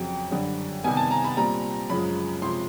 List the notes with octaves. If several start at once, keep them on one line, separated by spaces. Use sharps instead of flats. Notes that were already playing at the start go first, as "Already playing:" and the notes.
Already playing: F2 C#3 F#3 G5
F#2 D3 G3
C3 D#3 G3 B3 G#5
A5
A#5
B5
A#2 G3 C4 A#5
F#2 C#3 F3 G#3 B5
C3 F3 G#3 C6